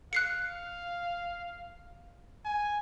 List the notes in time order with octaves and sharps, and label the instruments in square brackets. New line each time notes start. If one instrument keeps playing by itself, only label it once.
[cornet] F5 [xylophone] F#6 C7 C#7
[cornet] G#5